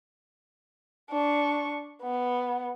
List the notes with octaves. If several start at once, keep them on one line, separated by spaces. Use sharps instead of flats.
D4 C#6
B3